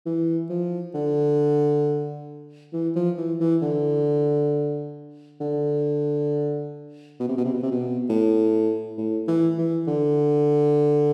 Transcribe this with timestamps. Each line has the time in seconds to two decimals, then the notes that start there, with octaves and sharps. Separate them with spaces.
0.06 E3
0.49 F3
0.94 D3
2.73 E3
2.96 F3
3.18 E3
3.40 E3
3.62 D3
5.40 D3
7.19 B2
7.28 C3
7.37 B2
7.45 C3
7.54 B2
7.63 C3
7.71 B2
8.09 A2
8.98 A2
9.28 E3
9.58 E3
9.87 D3